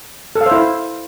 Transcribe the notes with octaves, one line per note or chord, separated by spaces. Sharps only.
A4
F5
C5
E4